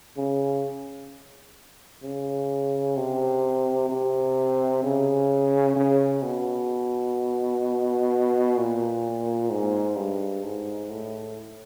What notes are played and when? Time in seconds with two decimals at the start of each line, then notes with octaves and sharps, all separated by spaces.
0.17 C#3
2.03 C#3
2.97 C3
3.89 C3
4.84 C#3
5.76 C#3
6.23 B2
8.57 A#2
9.50 G#2
9.96 G2
10.44 G#2
10.90 A2